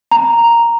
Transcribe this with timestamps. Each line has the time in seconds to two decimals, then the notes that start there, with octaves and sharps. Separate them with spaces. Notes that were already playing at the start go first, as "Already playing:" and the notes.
0.11 A#5